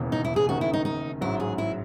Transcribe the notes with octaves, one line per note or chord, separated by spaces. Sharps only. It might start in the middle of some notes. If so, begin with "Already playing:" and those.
Already playing: E1 D#2 C#3 E3
D#4
E4
G#4
F#1 F#2 D#3 F#4
E4
D#4
D#4
A1 G#2 F#3 E4
G#4
E4